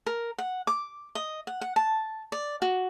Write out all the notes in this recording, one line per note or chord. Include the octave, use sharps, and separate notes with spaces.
A#4
F#5
D6
D#5
F#5
F#5
A5
D5
F#4